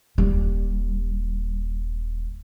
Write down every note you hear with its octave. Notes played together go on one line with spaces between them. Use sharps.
D#1 G3